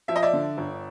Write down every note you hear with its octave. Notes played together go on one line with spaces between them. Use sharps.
F3 E5
D#5
D5 E5
D3
G1